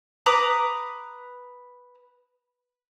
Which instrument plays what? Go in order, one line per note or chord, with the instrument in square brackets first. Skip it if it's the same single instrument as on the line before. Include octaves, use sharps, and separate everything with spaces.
[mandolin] B4 A#5 D6 D#6